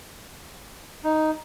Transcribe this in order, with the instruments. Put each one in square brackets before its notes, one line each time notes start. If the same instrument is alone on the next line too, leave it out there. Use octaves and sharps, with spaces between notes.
[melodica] D#4